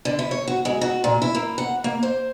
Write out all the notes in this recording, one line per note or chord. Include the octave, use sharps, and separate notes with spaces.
D3
E4
C#5
F#4
G#3
F#4
A#2
E4
A#3
F#5
A#3
C5